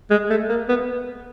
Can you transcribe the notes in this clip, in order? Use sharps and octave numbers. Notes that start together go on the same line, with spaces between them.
G#3
A3
A#3
B3